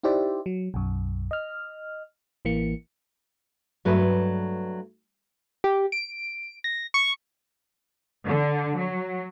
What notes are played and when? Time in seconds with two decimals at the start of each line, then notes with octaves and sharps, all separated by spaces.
0.03 D#4 E4 G4 C5 D5 E5
0.46 F#3
0.74 B1 F#2
1.31 D#5 F6
2.45 A1 E3 A#3 C#7
3.85 G2 F#3 A3 B4
5.64 G4
5.92 D7
6.64 A#6
6.94 C#6
8.27 D3
8.77 F#3